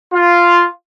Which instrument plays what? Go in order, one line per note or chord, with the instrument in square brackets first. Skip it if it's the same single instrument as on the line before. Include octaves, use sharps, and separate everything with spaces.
[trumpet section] F4